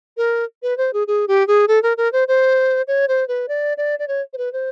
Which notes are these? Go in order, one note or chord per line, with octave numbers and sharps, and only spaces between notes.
A#4
B4
C5
G#4
G#4
G4
G#4
A4
A#4
A#4
C5
C5
C#5
C5
B4
D5
D5
D5
C#5
C5
B4
C5